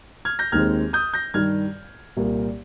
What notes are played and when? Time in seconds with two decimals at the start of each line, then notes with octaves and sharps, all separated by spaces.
0.25 F6 G#6
0.39 G6 A#6
0.52 D#2 D#3 G#3 C4 F6 G#6
0.93 D#6 G6
1.14 G6 A#6
1.34 G2 D#3 G3 F6 G#6
2.17 C2 A#2 G3 A#3